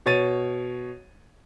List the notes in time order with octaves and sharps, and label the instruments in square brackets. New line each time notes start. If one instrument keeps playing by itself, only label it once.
[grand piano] B2 C#5 A6 D#7